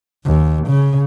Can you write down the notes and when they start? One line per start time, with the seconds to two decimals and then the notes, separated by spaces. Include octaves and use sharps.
0.25 D#2
0.68 C#3